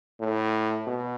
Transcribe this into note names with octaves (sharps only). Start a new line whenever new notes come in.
A2
B2